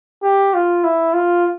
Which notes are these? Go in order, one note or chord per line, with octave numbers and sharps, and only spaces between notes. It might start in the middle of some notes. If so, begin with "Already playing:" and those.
G4
F4
E4
F4